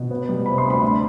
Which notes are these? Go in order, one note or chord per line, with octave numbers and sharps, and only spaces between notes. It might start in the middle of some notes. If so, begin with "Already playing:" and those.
Already playing: B2
B3
G3
C3 B5
C6
D2
B5
D4